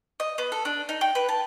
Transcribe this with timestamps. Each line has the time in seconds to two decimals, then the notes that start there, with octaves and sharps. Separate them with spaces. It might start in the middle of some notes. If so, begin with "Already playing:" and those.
0.20 D#5
0.38 B3
0.52 A4
0.65 D4
0.89 D#4
1.01 G5
1.15 B4
1.29 A5